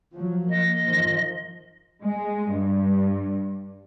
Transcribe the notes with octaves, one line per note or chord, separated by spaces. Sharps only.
F3 F#3
A#3 D#5
G2 D#3 F3
G#3
G2